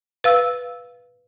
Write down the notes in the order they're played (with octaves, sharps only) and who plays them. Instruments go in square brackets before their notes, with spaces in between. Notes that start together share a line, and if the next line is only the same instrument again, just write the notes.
[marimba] B4 F5 E6